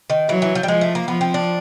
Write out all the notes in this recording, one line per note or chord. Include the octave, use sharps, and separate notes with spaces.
D#3
E3 F#3
E3
F3
G3
F3 G#3
A3
A#3
F3 B3
C4
D4